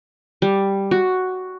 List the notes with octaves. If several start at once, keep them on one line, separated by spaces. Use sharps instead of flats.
G3
F#4